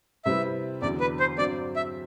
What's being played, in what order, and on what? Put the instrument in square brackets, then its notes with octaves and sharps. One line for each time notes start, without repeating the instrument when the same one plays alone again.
[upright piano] C3 G3 C4 E4 B4 [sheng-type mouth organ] E5
[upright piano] E2 D3 F#3 [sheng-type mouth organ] D5
[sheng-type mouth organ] B4
C5
[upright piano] G2 F#3 C4 [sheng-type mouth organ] D5
[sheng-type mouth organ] E5